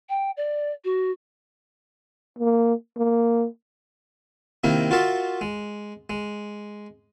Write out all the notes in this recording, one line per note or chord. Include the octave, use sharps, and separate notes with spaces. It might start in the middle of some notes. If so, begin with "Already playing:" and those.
G5
D5
F#4
A#3
A#3
C3 D#3 A#3 E4 A#4
F4 F#4 A#4 E5 A5 C6
G#3
G#3